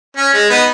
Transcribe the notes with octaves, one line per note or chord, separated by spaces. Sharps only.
C#4
G#3
B3 D#4